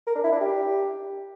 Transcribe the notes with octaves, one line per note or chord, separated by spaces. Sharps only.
A#4
D4
E4
D4
G4